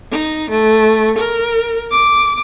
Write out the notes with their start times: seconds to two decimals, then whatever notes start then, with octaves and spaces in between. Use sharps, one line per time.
0.11 D#4
0.50 A3
1.18 A#4
1.91 D6